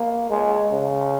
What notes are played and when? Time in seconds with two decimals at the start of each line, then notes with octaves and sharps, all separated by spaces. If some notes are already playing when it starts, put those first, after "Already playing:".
Already playing: A#3
0.29 G#3
0.72 C#3